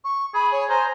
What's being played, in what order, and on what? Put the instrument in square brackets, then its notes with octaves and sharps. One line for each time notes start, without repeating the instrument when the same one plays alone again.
[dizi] C#6
[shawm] G#4 [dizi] B5
[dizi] C#5
[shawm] C5 [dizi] G#5 [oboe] A#5